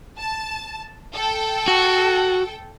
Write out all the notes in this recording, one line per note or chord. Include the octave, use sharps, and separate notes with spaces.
A5
A4 G5
F#4